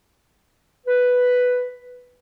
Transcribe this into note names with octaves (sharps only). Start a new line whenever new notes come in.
B4